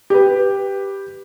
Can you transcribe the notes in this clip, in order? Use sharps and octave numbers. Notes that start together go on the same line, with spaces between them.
G4 B4